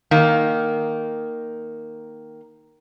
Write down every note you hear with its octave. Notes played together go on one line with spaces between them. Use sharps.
D#3 A#3